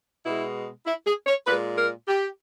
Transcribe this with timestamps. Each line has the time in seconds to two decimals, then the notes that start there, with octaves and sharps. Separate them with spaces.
0.24 B2 G#3 E4
0.86 E4
1.06 G#4
1.26 C#5
1.46 A#2 G#3 B4
1.76 A#4
2.07 G4